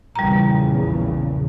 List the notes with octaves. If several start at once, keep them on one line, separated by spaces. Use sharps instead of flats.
A#1 E2 C#3 G3 A#5